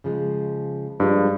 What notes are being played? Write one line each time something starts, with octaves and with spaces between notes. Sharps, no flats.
C#3 F3 G#3
G2 F3 G#3 F4